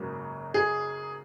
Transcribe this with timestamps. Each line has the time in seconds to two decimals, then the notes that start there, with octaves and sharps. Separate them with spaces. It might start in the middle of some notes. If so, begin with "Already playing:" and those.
Already playing: G#1 F#2 C#3 F#3 A#3
0.54 G#4